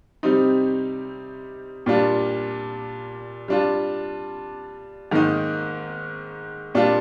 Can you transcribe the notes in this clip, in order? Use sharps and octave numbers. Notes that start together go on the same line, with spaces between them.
C3 G3 C4 D#4
A#2 G3 D4 F4
G3 D4 F4
G#2 D#3 A#3 D#4
A#2 G3 D4 F4